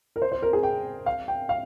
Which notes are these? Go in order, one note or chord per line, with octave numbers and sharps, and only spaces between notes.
A#4
C5
C5
A#4
G#4
G5
F5
G5
F5